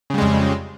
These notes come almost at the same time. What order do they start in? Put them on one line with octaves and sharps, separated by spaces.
C#3 G3 G#3 F2